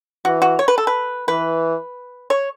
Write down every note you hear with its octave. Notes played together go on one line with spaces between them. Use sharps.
E3 F#4
F#4
C#5
B4
A4
B4
E3 B4
C#5